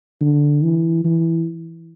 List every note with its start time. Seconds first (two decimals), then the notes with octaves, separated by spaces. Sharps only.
0.21 D3
0.63 E3
1.04 E3